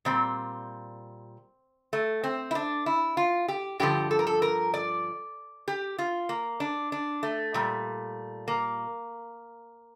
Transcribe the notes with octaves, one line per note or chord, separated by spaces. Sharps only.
A#2 G3 C4
A3
C4
E4
D4
E4
F4
G4
G2 D3 F3 G4
A4
A#4
A4
A#4
D5
G4
F4
A#3
D4
D4
A3
A#2 G3
A#3